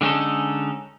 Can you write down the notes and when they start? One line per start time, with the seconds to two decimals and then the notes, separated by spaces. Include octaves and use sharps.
0.01 D3 G#3 C#4 D#4 A4